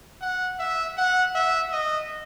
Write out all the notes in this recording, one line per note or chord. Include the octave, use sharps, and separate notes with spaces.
F#5
E5
F#5
E5
D#5